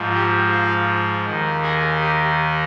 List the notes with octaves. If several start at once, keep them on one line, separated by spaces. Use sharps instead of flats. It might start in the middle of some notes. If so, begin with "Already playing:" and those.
Already playing: G#2 F3
G4
F4
D#2 D#3
G#4
G4